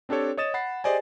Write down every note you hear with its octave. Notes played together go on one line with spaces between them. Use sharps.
C4 D4 G4 A4 C#5
C#5 D#5 D#6 A6 E7
F#5 B5 A6 C7
G4 G#4 C5 D5 D#5 G#5